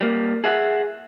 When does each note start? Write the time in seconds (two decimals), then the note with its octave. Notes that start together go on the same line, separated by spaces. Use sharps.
0.01 G3 A#3
0.44 G#4 E5 F#5